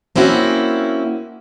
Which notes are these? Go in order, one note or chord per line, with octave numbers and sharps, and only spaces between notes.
A#3 C4 C#4 E4 F#4